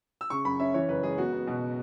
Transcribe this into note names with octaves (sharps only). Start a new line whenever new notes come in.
E6
C#3 C#6
F#2 B5
C#4 E5
E3 C#5
F#1 B4
G#3 G#4
B3 F#4
B3
B2